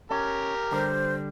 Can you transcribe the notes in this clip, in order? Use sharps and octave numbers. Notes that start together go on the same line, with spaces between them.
C#4 G4 A#4
D3 G3 C5